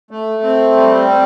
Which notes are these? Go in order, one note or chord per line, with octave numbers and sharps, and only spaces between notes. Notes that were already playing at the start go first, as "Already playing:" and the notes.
A3
C4
G3
C4